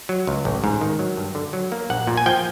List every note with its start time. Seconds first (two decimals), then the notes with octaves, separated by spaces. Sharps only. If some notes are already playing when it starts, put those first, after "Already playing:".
0.09 F#3
0.27 C#2
0.45 A1
0.64 G#2
0.81 D#3
0.99 F#3
1.17 G2
1.35 D3
1.53 F#3
1.72 A#3
1.90 A#1 F#5
2.07 A#2
2.17 G#5
2.26 F3 G5